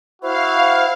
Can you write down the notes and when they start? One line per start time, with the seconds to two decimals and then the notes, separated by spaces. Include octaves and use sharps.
0.22 E4 F#4 C5 F5